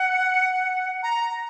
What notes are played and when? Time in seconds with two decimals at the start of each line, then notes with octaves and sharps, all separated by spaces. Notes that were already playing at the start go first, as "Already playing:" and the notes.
Already playing: F#5
1.03 A#5